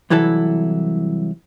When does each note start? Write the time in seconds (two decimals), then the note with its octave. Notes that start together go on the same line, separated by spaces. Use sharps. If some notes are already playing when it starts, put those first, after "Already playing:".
0.10 C2 E3 F#3 E4 A4